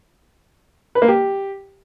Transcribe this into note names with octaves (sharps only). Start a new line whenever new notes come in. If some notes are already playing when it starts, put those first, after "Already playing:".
B4
A#3
G4